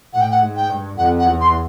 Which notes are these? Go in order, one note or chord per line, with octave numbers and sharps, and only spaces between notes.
A2 F#5
G5
F#5
G#2
G5
G2
F2 F#5
F#5
E2
C6